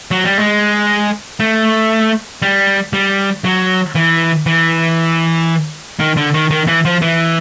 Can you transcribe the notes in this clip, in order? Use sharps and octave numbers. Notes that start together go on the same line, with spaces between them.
F#3
G3
G#3
A3
G3
G3
F#3
E3
E3
D#3
D3
D#3
D#3
E3
F3
E3